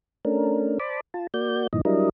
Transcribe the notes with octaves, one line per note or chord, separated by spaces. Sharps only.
A3 C#4 D4 A#4
C5 D5 A5 B5 D6
F4 A5
A#3 F#4 D5 G6
G2 A#2 D#3 E3 D#5
F#3 G3 D4 E4 A#4 D#5